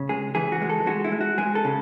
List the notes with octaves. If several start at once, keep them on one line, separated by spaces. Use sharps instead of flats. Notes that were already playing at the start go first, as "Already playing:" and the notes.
Already playing: C#3
G#3 G#4
E3 G#4
F#4
G#3
A4
G#3 F#4
E4
G#3
F#4
G#3 G#4
A4
C#3